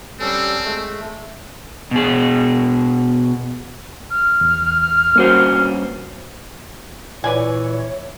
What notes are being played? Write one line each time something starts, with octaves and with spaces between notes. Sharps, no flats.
G3 C4 C#4 A4
G#3 A3
B2 G#4
F6
E2
G2 A#3 C#4 F#4 C5
A#2 E3 B4 C#5 D5 G#5